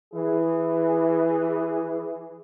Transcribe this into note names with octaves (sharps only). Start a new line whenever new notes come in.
E3 G#4